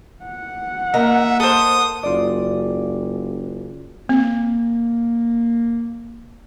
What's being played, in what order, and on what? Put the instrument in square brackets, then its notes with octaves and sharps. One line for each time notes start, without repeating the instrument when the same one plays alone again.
[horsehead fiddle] F#5
[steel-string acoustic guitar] A#3 A#4 D#5 [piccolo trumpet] E5 [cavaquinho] A#5
[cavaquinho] A4 C5 [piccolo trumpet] D#6
[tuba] F#1 [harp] F4 D5
[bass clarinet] A#3 [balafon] C4